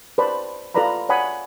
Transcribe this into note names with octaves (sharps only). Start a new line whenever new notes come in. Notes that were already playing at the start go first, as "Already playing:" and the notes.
B4 C5 D5 A5 B5
F4 A4 B4 D5 A#5 B5
C#5 D5 F#5 G#5 B5 D#6